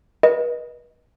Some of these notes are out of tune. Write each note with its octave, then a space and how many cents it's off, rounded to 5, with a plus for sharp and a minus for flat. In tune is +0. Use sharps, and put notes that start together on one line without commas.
B4 -35 D#5 +0